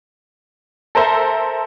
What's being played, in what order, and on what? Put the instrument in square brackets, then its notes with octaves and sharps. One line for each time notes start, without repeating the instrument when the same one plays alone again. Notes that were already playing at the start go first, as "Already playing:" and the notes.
[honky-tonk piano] A4 A#4 C5 E5